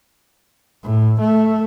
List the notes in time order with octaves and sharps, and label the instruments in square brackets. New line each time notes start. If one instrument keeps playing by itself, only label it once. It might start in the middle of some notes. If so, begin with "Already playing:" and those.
[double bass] A2
A3